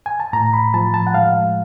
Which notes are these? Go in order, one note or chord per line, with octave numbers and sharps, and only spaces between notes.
G#5
A5
A2 A#5
B5
F3 A5
A5
F#5
G#3 F5